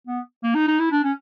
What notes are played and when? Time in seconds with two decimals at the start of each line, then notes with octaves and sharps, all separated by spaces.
0.07 B3
0.44 A#3
0.55 D#4
0.68 D#4
0.79 E4
0.91 D4
1.04 C#4